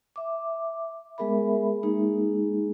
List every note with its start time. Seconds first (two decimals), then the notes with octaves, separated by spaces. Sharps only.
0.16 E5 D6
1.18 G#3 B3 G#4 A#4 E5 B5
1.83 G#3 A#3 D#4 G#4